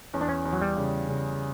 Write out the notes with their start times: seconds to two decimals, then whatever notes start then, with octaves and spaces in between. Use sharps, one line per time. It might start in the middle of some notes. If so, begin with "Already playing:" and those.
0.13 E2 C#4
0.21 D4
0.29 C#4
0.45 E2
0.53 F#3
0.62 G3
0.77 C#3
1.08 C#3